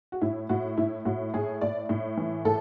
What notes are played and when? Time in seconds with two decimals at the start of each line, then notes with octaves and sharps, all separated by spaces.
0.12 F#4
0.21 A2 E4
0.49 A2 F#4
0.77 A2 E4
1.05 A2 F#4
1.34 A2 G#4
1.61 A2 D5
1.89 A2
2.17 E3
2.45 A2 A4